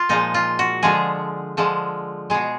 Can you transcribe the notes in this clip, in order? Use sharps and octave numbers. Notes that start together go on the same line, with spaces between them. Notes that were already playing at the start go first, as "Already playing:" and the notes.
Already playing: F4
A#2 F3 G#3 D#4
F4
F#4
D3 F3 G#3 G#4
D3 F3 G#3
B2 G#3 G#4